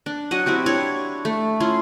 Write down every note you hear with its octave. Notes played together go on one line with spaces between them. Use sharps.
D4
F#3 F#4 D#5 F#5
C4 E4 F#4 G4
D4 E4 C#5
A3
C#4 E4 F4 C6